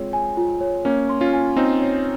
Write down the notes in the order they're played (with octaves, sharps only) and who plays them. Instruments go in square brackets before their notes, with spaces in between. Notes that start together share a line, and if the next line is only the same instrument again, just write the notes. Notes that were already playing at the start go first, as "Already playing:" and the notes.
Already playing: [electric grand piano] G#3 C4 [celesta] F4 G#4 C#5
[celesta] G#5
F4
C#5
[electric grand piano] A#3 C#4 [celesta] C#5
[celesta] C6
[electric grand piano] C#4 F4
[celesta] G#5
[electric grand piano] C4 D#4 [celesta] C#5
[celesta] C#5